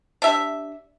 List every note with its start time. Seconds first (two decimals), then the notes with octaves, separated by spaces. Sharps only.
0.22 D4 G4 E5